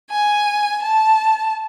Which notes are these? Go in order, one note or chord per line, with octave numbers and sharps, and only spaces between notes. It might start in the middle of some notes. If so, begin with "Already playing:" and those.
G#5
A5